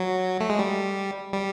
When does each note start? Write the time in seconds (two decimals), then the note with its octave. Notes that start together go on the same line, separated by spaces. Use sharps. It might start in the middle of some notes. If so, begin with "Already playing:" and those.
Already playing: F#3
0.40 A3
0.50 G#3
0.59 G3
1.33 G3